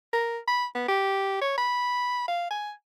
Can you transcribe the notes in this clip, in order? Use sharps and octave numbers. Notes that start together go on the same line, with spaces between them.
A#4
B5
B3
G4
C#5
B5
F5
G#5